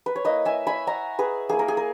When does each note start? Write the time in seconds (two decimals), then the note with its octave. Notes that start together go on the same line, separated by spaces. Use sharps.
0.06 B4
0.16 C#5
0.25 A#3 E4 B4 D#5
0.45 E5 G#5
0.67 G#5 B5
0.87 F#5 A#5
1.19 G#4 B4
1.49 A#3 E4 G#4
1.59 A#4
1.68 G#4
1.77 A#4